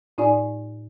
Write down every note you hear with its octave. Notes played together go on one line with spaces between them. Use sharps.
A2 D#4 F4 D5 G#5